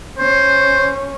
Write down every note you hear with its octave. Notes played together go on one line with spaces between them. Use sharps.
C#4 C5